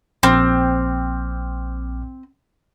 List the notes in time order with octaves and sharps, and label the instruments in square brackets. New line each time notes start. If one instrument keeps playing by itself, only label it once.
[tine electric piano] A#1 D6 F6 [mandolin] C4